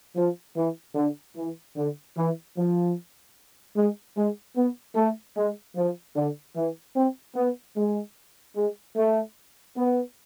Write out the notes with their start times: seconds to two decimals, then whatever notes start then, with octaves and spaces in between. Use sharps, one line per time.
0.16 F3
0.56 E3
0.95 D3
1.36 E3
1.75 D3
2.16 E3
2.56 F3
3.75 G#3
4.16 G#3
4.55 B3
4.95 A3
5.36 G#3
5.75 F3
6.15 D3
6.56 E3
6.95 C4
7.35 B3
7.75 G#3
8.55 G#3
8.95 A3
9.75 B3